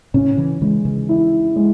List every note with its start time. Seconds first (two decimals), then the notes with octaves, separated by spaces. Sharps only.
0.14 A2 C#3 C#4
0.37 C#3 E3
0.61 C#3 E3 G#3
0.85 C#3 E3
1.09 E4
1.56 G#3